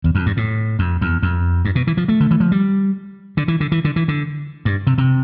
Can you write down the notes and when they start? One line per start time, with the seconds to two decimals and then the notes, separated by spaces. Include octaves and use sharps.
0.04 E2
0.15 F2
0.26 G2
0.37 A2
0.79 F2
1.01 E2
1.22 F2
1.65 G2
1.75 B2
1.87 E3
1.97 F3
2.08 A3
2.20 D3
2.31 E3
2.40 F3
2.52 G3
3.37 D3
3.48 E3
3.60 D3
3.72 E3
3.85 D3
3.96 E3
4.08 D3
4.65 G2
4.87 C3
4.98 C3